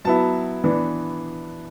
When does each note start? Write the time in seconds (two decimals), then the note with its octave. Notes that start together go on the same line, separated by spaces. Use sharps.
0.05 F#3 B3 E4 A5
0.64 E3 B3 D4